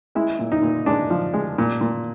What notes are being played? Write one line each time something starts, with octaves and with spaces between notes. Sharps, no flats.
G#3 E4
A#2
D#4
A#2
G#3 D4
F3
G#3
A#2
A#2